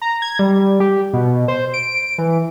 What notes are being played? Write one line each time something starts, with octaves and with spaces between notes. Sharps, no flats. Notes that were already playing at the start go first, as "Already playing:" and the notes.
A#5
G#6
G3
G4
B2
C5
D7
E3